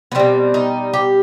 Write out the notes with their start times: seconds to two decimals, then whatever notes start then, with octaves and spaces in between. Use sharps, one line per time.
0.12 B3
0.15 B2 G3 C4
0.54 D#4
0.94 G4